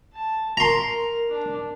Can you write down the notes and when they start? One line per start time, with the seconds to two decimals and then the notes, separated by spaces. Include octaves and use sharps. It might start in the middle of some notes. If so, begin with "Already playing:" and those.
0.13 A5
0.57 A#4 A#5 C6
1.29 D4